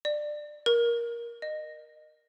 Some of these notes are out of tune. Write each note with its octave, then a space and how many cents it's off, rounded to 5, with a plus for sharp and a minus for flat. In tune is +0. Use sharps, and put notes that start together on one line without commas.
D5 +20
A#4 +15
D#5 -25